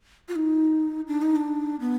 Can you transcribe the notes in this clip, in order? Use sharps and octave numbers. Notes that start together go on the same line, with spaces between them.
F4
D#4
D4
D#4
D4
B3